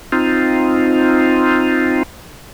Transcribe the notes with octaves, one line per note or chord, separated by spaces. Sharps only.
C4 D#4 F4